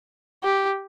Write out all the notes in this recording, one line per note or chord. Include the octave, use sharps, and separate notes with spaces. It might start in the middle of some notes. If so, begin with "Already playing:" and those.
G4